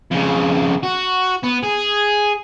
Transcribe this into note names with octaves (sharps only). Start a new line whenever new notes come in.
F2 C#3
F#4
B3
G#4